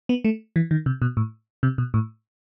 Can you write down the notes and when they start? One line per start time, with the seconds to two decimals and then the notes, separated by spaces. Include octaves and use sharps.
0.09 B3
0.25 A3
0.56 E3
0.71 D#3
0.86 C3
1.02 B2
1.17 A2
1.63 C3
1.78 B2
1.94 A2